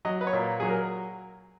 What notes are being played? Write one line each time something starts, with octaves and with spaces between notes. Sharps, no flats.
F#3 D#5
B4
C#5
A#2
F#3 G#4
A#4